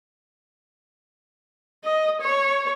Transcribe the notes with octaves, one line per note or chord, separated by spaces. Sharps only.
D#5
C#5